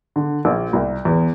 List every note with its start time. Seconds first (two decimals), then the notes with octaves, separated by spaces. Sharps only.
0.16 D3
0.45 A#1
0.73 C2
1.05 E2